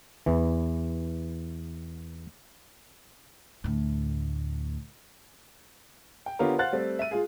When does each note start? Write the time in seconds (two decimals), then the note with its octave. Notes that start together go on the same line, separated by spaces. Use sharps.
0.26 E2 E3
3.64 D2 A2
6.26 G5
6.39 D3 B3 F4 G4 A#4 C#5
6.58 C5 F5 F#5 F#6 A6
6.73 G3 A3 C4
6.99 E5 D#7
7.11 G#3 F4 G#4